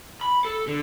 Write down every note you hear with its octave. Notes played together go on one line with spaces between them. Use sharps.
B5
A4
D3